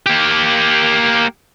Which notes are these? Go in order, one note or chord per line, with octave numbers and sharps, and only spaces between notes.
A#3 G4